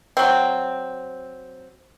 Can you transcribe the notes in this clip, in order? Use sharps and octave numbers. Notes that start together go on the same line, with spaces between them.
F#3 C4